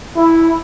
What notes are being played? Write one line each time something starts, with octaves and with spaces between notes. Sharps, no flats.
E4